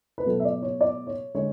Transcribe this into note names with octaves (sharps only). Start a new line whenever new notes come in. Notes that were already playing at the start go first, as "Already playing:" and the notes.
B4
B2 F#3 A3 A4
E5
D5
C#5
D5
C#5
D3 G#3 C#5